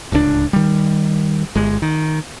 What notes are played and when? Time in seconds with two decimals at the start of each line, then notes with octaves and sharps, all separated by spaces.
0.12 D1 C#2 C3 D4
0.53 D#3 G3
1.55 G1 G#3
1.82 D#3